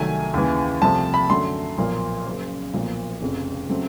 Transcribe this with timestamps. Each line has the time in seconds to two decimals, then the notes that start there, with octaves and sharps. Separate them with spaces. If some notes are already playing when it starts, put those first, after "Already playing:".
Already playing: C2 C3 D#3 F#3 A3 G#5
0.34 D#2 C#3 E3
0.82 C2 C3 F3 A3 C4 A5
1.14 B5
1.29 F#2 D3 F#3 A3 C6
1.78 B1 A#2 F3 A#3
2.26 F#1 F#2 C#3
2.74 B1 A#2 F3 A#3
3.21 F1 F2 C#3
3.69 C#3 F#3 A3 C4